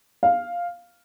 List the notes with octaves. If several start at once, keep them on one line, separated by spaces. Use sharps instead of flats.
F5